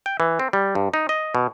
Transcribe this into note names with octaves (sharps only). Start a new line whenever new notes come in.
G5
E3
C4
G3
G2
D#4
D#5
B2